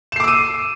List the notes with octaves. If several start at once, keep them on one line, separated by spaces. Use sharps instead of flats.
D6 E6 C7 D#7 E7